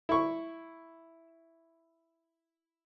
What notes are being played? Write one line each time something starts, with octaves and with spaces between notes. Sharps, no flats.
E4 C#6